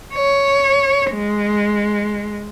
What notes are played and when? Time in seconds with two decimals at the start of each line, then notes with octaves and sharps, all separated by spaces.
0.15 C#5
1.13 G#3